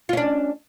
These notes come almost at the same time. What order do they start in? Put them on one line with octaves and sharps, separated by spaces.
F4 C#4 D4